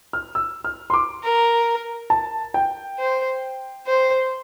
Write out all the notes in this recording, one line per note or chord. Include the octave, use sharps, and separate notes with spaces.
F6
E6
F6
C6
D6
A#4
A5
G5
C5
C5